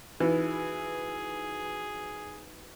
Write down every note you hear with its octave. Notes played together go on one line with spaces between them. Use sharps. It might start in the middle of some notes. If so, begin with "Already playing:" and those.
E3 D#4 F#4 G#4 B4